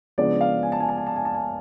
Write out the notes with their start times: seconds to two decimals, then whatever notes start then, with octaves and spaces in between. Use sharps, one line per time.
0.18 C#3 F3 G#3 B3 D4 D5
0.41 F5
0.63 G#5
0.72 A5
0.80 G#5
0.89 A5
0.98 G#5
1.07 A5
1.16 G#5
1.25 A5
1.35 G#5